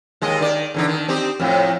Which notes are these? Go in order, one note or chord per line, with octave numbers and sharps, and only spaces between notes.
D#2 G#3 D#5
D#3 D5
E2 D3 D#4
D#3
C4 D#4 G4
F2 A2